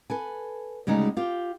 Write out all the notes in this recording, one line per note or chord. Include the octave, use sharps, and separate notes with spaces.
A4 B4 G#5
D2 C#3 G3 G#3 D#4 G#4
F4 G4